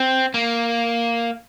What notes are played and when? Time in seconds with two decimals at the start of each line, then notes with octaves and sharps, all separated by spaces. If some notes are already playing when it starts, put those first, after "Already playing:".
Already playing: C4
0.34 A#3